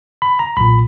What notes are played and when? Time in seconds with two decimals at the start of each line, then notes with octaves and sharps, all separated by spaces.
0.22 B5
0.39 A#5
0.57 B1 A#2 B5